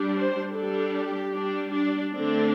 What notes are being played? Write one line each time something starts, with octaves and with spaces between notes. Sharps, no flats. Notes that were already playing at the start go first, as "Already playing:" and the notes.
Already playing: G3 D4
C5
G3 D4 A4
G4
G3 D4
D4
D3 A3 C4 D4